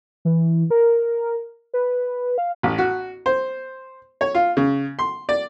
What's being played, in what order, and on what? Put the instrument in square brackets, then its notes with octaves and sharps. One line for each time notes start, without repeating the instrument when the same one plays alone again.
[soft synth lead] E3
A#4
B4
F5
[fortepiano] A1
F#4
C5
C#5
F4
C#3
C6
D5